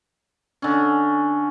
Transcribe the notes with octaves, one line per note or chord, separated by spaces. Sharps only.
D3 C#4